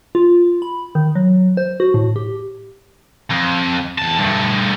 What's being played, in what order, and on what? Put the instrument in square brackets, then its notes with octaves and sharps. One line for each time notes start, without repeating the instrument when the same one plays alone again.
[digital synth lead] F4
B5
D#3
F#3
C5
F#4
A2
G4
[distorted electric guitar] F2
E2 A5
G2 A3